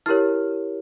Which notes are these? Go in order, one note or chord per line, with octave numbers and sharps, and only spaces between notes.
E4 G4 A#4 C#5 F6